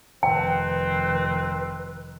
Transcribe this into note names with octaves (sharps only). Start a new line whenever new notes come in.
F1 D#3 C4 B4 G5